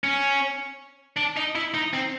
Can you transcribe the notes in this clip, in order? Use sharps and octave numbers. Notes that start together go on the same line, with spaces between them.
C#4
D4
D#4
E4
D#4
C4